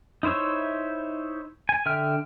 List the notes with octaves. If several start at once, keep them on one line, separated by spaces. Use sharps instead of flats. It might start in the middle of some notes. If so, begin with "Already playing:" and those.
D#4 E4 C5 C#5 E5
G#5
D3 E5 G5 F6